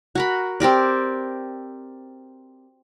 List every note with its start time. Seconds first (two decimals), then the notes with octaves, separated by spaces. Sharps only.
0.15 F#4 A#4 B5
0.60 C4 G4 A#4 D5